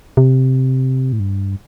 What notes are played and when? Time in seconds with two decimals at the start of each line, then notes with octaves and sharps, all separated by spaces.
0.17 C3
1.13 A2
1.20 G2